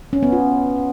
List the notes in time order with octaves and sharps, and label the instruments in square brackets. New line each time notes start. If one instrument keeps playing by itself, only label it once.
[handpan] C#4
B3
F4